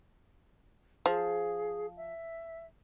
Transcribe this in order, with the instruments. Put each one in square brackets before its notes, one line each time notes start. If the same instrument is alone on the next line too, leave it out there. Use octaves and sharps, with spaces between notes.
[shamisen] F3 [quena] G#4
[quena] E5